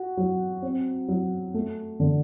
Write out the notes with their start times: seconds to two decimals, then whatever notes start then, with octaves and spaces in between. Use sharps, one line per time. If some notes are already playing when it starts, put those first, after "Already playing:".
Already playing: F#4
0.17 F#3
0.62 C4
1.08 F#3
1.54 A3
2.00 D3